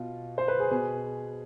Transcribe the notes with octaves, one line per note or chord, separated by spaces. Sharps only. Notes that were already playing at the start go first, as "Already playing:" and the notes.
Already playing: B2 F4
C5
B4
G#4
B2 G#4